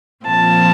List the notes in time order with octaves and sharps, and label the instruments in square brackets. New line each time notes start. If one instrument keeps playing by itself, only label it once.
[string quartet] A#2 F3 C4 F4 A5